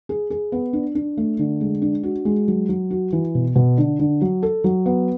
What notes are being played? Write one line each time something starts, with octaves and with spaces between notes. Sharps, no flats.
G#4
G#4
B3
D4
D4
A3
D3
G#3
D4
F#4
G#3
F#3
F#3
F#4
E3
B2
B2
D3
D3
F#3
A4
F#3
B3